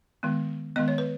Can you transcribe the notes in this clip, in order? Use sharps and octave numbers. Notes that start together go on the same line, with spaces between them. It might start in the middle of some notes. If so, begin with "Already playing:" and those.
D#3 G#3 B3
D#3 G#3 B3 D#5
C#5
B4